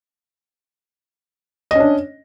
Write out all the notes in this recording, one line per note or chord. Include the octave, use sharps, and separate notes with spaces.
C#4 D4 D#5